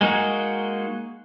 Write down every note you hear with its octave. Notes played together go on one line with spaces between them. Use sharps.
G#3 A#3 D#4 F#4